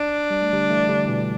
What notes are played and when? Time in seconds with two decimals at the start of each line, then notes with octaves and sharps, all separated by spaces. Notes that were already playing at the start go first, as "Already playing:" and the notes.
Already playing: D4
0.30 G3
0.42 A3
0.53 D3 G3
0.70 E3 A3
0.89 D3 G3
1.08 B2 E3